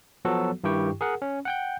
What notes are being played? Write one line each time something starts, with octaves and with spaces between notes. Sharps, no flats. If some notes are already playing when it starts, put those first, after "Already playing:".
F3 F#3 B3 F#4 A4
G2 D#3 E4 G4 G5 C#6
G#4 A#4 F#5
C#4
F#5 G5 G6